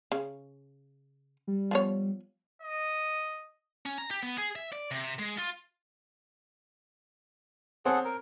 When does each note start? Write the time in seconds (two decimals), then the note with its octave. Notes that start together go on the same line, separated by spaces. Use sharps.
0.12 C#3
1.48 G3
1.71 F3 B3 C#5
2.62 D#5
3.86 C#4
3.98 A#5
4.11 G4
4.23 B3
4.38 G#4
4.56 E5
4.72 D5
4.91 C3
5.19 G#3
5.39 F4
7.85 C4 G#4 A4 C5 C#5 F#5
8.05 A#4